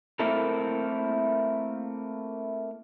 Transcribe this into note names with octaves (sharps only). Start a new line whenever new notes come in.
A3 A#3 C4 E4 A4 A#4